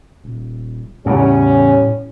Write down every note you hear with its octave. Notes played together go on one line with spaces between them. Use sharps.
D#1
E2 A2 C#3 G3 C#4